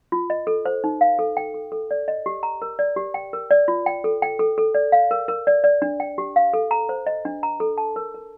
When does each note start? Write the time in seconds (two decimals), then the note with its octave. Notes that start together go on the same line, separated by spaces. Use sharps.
0.12 F4
0.30 D#5
0.47 A4
0.65 C5
0.84 D#4
1.01 F5
1.19 A4
1.37 G5
1.54 A4
1.72 A4
1.91 D5
2.08 D#5
2.26 G4
2.43 A#5
2.62 A#4
2.79 D5
2.96 G4
3.14 G5
3.33 A#4
3.51 D5
3.68 F4
3.86 G5
4.04 A4
4.22 G5
4.39 A4
4.58 A4
4.75 D5
4.92 F5
5.11 A#4
5.28 A#4
5.47 D5
5.64 D5
5.82 D4
6.00 G5
6.18 G4
6.36 F5
6.54 A4
6.71 A#5
6.89 C5
7.07 D#5
7.25 D4
7.43 A#5
7.60 A4
7.78 A5
7.96 A#4
8.14 A#4